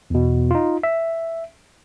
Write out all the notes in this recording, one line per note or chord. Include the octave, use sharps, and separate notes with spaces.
E2 B2
D#4 F4
E5